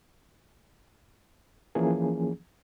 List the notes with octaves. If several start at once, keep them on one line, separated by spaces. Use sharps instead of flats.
E3 F3 A#3 C#4 G#4